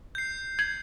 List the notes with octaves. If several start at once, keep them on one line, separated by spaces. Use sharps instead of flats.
G6 C7
G#6